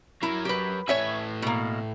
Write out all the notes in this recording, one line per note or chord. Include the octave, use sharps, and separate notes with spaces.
F#3 E4 A#4
G4 B4
A2 B4 C#5 E5 G#5
B2 A#3